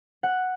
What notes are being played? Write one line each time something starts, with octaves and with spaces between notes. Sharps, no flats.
F#5